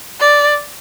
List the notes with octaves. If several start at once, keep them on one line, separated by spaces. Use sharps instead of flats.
D5